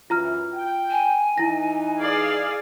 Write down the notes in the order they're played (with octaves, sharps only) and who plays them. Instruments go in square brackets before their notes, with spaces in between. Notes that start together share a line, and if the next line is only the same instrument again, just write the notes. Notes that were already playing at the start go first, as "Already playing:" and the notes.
[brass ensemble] F#2 E3 [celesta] F4 A#5 F6
[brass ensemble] G5
[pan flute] G#5
[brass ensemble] E3 D#4 [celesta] E4 A#6
[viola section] G#4 D5 F5